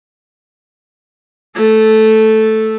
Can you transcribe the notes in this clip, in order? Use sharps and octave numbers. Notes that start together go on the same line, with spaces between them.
A3 A4